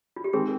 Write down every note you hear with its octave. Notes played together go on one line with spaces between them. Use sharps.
F4
G4
D#3 G#3 C4 G#4